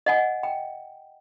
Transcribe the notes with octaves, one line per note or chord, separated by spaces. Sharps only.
D#5 F#5 G#5
G5